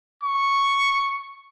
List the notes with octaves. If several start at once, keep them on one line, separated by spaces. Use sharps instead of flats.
C#6